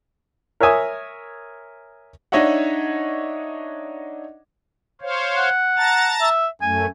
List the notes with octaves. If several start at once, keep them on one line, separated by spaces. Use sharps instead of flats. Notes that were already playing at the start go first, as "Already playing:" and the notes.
A#4 C#5 E5 G#5 D#6
D4 D#4 C#5 D#5 E5 F#5
C5 C#5 F5
F#5
A5 A#5 A6
E5
F#2 A3 G#5